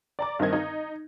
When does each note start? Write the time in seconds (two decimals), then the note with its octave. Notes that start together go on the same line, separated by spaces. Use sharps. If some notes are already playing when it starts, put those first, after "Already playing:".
0.19 D5 A#5 D6
0.39 G2 D#3 C4 D#5 G#6
0.53 D#4